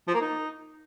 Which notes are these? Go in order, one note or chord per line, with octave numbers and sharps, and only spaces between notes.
F3
A#3
D#4